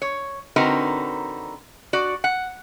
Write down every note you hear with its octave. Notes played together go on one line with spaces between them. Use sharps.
C#5
D3 C4 D#4 F#4 A#4 B4
F#4 D5
F#5